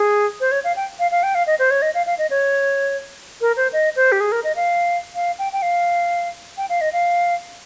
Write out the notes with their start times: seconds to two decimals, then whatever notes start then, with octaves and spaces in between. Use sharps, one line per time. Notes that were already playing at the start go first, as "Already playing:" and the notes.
Already playing: G#4
0.40 C5
0.52 C#5
0.64 F5
0.76 G5
0.99 F5
1.11 F5
1.23 G5
1.35 F5
1.47 D#5
1.59 C5
1.71 C#5
1.82 D#5
1.95 F5
2.06 F5
2.18 D#5
2.30 C#5
3.41 A#4
3.57 C5
3.73 D#5
3.96 C5
4.12 G4
4.20 G#4
4.32 A#4
4.44 D#5
4.56 F5
5.15 F5
5.39 G5
5.53 G5
5.62 F5
6.57 G5
6.69 F5
6.81 D#5
6.93 F5